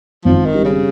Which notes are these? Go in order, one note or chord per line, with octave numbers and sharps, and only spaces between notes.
G#1 F3
D#3
G3
C#3